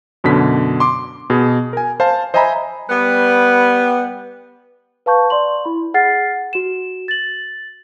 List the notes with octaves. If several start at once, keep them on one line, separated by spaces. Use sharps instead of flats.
F#2 B2 D3 B6
C6 D6
B2 G#4
A#4 G#5
C5 F5 A5
C5 D#5 E5 G#5 A#5 B5
G3 B3
B4 F5 A5 C#6 G6
D5 C6 F#7
E4 B5
G#4 F#5 F6 A6 C7
F#4 E7
A6 F#7